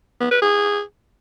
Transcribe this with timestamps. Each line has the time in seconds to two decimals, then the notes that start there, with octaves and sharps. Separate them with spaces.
0.20 B3
0.31 B4
0.42 G#4